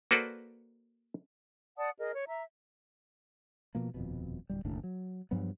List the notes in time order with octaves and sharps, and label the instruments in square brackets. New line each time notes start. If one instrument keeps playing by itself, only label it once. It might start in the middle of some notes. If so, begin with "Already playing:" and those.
[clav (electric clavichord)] A#3 F#4 A4 B4 C5 D5
[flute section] D5 F#5 A5 D#6
G#4 A#4 D#5
C#5
E5 A#5
[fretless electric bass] B2 F3 A#3
D#1 F2 B2
D1 G3
F#1 D#2 A2 D4
F#3
G2 F3 F#3 B3